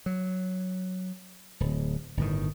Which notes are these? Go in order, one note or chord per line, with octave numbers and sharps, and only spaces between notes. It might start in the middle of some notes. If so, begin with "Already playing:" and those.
F#3
D1
G1 A2 D#3